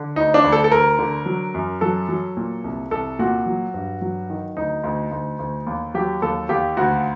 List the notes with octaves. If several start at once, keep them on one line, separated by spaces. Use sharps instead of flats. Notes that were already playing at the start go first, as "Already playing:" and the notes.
Already playing: D3
D2 D#4
D4
D2
A4
A4
D2 A#4
D3
F#3
F#2
F#3 A4
F#3
A#2
C2
C2 A4
A#2 F#4
F#3
G2
F#3
D#3
D2 D#4
D2
D2
D2
D#2
F#3 G4
D#2 A4
D#2 G4
D2 F#4